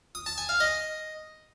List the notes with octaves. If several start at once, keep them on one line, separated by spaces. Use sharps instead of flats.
D#6
A5
G#5
F5
D#5